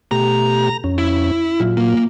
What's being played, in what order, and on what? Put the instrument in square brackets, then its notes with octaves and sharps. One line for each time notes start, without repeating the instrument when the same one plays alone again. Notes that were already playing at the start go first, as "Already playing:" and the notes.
[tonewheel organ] B2 A3 G4 [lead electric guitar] A#5
[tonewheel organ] F2 C#4
[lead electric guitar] E4
[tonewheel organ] A#2 F#3 F4
[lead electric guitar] A#3